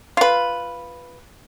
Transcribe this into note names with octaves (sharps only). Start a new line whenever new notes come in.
F4 B4